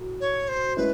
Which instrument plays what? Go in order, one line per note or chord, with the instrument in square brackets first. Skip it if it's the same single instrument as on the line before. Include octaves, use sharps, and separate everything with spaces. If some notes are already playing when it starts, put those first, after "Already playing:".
Already playing: [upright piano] A2 F#3
[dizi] C#5
C5
[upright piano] G#3 C#4 E4 [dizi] B4